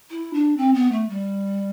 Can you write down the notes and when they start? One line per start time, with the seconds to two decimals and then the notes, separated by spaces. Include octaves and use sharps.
0.11 E4
0.34 D4
0.57 C4
0.74 B3
0.92 A3
1.09 G3